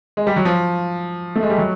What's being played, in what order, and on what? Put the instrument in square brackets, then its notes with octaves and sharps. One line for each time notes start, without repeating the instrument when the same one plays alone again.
[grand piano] G#3
G3
F#3
F3
A3
G#3
G3
F#3